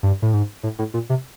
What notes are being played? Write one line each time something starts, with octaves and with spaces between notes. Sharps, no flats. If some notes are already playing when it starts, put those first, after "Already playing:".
G2
A2
G#2
A2
A2
A#2
C3